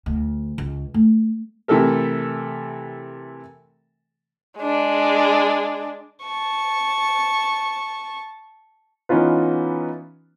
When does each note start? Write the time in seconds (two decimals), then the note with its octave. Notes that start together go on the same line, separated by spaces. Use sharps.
0.06 D2
0.58 C#2
0.94 A3
1.68 C3 E3 A3 A4 A#4
4.59 G#3 D4
6.23 A5 C#6
9.09 E3 B3 C#4 D#4 F4 B4